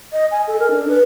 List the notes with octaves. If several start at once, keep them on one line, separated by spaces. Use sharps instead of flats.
D#5
G#5
A4
A#4
D4
B4